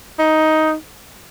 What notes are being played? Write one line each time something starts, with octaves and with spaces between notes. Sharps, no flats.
D#4